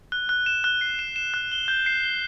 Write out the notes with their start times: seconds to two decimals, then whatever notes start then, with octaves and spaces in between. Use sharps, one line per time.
0.12 F#6
0.29 F#6
0.46 E7
0.64 F#6
0.81 C7
0.99 E7
1.16 E7
1.34 F#6
1.52 G7
1.68 G6
1.86 C7
2.03 G7